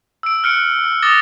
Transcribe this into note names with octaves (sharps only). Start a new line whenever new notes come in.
E6 D7
F6 F#6 C#7 D7
D6 D#6 A6 A#6 G7